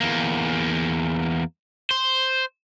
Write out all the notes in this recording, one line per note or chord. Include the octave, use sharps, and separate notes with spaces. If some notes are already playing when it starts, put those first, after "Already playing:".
E2 A#3
C5